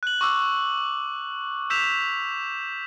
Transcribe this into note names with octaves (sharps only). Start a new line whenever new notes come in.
F#6 F#7
C#6 D6 E6 F#6
E6 G6 B6 E7 F7